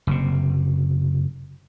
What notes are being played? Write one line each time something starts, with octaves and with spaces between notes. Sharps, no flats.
F#1 C3